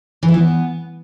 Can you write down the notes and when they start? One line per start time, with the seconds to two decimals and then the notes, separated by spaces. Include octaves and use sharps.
0.23 E3
0.28 E4
0.34 B3